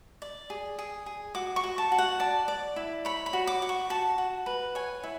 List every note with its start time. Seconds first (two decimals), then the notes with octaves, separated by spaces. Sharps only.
0.22 D5
0.50 G#4
0.79 G#4
1.06 G#4
1.35 F#4 D6
1.56 C#6
1.64 F#4
1.78 A5
1.92 F#4
1.98 F#5
2.20 D5 A5
2.48 D5
2.76 E4
3.05 C#5 B5
3.26 B5
3.33 F#4
3.47 D6
3.62 F#4
3.69 C#6
3.90 F#4 A5
4.18 F#4
4.46 B4
4.75 C#5 G#5
5.03 E4